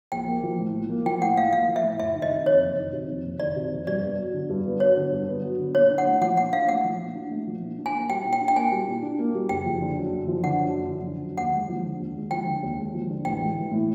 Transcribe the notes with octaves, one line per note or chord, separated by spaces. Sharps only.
A#1 G5
A#3
F3
A2
A#1
A#3
F3 G5
A2 F#5
A#1 F5
A#3 F5
F3
E5
A2
F#1 E5
D#3
D#5
C3
F2 C#5
F#1
D#3
C3
F2
F#1
D#3 D5
C3
F2
G2 D5
B3
F#3
D3
G2
B3
F#3 C#5
D3
G2
B3
F#3
D3
A#2 C#5
D4
F#5
A3
F3 F#5
A#2 F#5
D4 F5
A3 F#5
F3
A#2
D4
A3
F3
A#2
D4
G#5
A#3
G3 G5
A#2
G5
D4
G5
A#3 G#5
G3
A#2
D4
A#3
G3
F#1 G5
F3
D3
F#2
F#1
F3
D3 F#5
F#2
F#1
F3
D3
F#2
D#2 F#5
G#3
F3
D3
D#2
G#3
F3 G5
D3
D#2
G#3
F3
D3
A1 G5
G#3
E3
A2